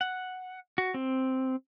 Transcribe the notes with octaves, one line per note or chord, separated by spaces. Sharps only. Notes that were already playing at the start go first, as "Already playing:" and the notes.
F#5
F#4
C4